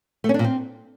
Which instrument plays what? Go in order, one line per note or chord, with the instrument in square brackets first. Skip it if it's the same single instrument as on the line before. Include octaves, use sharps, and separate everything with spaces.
[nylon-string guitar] A3
C#4
D4
A#2
C4